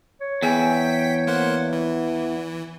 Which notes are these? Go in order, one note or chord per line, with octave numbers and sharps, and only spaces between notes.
C#5
E2 B3 G#4 G5 G#5 B6
A#3 C5 F#5
E3